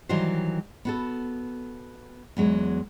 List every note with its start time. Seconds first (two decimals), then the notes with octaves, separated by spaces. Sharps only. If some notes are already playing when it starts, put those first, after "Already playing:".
0.09 D#3 E3 F#3 G3 F#4 C5
0.85 B3 F#4 A4
2.37 E2 F#3 G#3